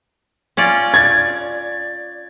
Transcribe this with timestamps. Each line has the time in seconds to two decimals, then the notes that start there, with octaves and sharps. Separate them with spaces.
0.57 C#4 F4 D5
0.94 G#6 A6